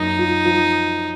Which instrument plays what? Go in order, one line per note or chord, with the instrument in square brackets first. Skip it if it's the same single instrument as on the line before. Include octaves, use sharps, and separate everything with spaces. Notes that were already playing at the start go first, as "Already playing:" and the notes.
Already playing: [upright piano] F#2 A#3 [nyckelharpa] D#4
[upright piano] F4
F3